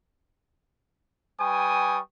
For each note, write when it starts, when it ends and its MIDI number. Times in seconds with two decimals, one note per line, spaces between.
1.40 2.00 55
1.40 2.00 71
1.40 2.00 79
1.40 2.00 80
1.40 2.00 85
1.40 2.00 87